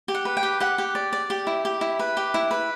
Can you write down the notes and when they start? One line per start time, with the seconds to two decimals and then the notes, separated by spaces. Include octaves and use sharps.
0.08 G4
0.15 F#5
0.25 B4
0.37 G5
0.43 G4
0.60 G4 F#5
0.78 G4
0.95 D5
1.13 D5
1.30 G4
1.47 E4
1.65 G4
1.81 E4
1.99 B4
2.17 G4
2.34 E4
2.51 B4